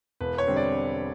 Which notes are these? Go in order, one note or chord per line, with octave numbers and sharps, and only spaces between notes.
E1 B4
C#5
D3 G3 C4
D5